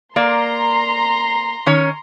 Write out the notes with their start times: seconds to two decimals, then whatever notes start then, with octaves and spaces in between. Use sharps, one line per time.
0.16 A#3 D5 A#5 C6
1.66 D#3 C#4 C#5